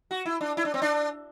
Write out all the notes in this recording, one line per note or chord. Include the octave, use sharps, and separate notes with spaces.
F#4
E4
D4
E4
D4
C4
D4